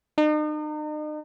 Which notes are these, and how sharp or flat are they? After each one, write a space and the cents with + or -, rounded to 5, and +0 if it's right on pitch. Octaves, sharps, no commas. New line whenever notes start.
D#4 -40